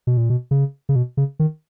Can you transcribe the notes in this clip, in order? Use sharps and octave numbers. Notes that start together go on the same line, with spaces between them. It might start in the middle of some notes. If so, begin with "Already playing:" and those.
B2
A#2
B2
C#3
C#3
B2
C#3
D#3